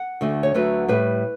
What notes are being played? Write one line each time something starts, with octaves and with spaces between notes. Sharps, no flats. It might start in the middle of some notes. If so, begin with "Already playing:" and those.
Already playing: F#5
D2 D3 A3
C#5
D2 D3 F#3 A3 B4
A2 G3 B4